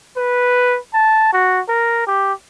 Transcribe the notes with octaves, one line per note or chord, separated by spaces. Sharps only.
B4
A5
F#4
A#4
G4